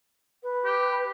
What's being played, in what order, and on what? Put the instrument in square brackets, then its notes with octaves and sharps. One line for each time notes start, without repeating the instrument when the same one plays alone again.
[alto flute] B4
[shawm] G4